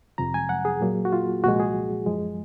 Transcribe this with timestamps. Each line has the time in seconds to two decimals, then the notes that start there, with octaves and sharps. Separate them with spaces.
0.18 F2 C3 F3 A#5
0.34 G#5
0.49 F#5
0.65 G#4
0.81 A#2 F#3 A#3
1.05 F#4
1.13 F4
1.44 C2 A#2 F3 G#3 F#4
1.60 G#4
2.06 F#2 F3 G#3